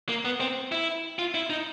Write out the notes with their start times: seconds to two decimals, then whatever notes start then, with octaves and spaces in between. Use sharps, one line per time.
0.09 A#3
0.25 B3
0.40 C4
0.72 E4
1.19 F4
1.34 E4
1.50 D#4